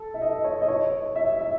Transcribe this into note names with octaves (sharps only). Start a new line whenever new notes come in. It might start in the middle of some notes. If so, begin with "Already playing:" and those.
Already playing: A4
E5
D#5
C#5
D#5
C#5
E5
E5